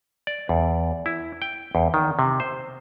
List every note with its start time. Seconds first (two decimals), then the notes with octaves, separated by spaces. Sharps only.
0.27 D5
0.49 E2
1.06 E4
1.42 G5
1.75 E2
1.94 D#3
2.19 C3
2.40 C5